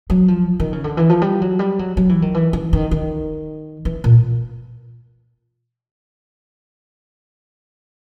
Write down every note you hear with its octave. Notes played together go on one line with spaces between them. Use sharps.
F#3
F3
D#3
C#3
D3
E3
F3
G3
F#3
G3
F#3
F#3
E3
D#3
E3
E3
D#3
D#3
E3
A#2